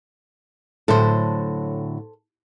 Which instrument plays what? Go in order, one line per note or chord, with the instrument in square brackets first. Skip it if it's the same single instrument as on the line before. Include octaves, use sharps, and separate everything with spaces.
[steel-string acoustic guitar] A2 D3 F#3 [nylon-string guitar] A4 C5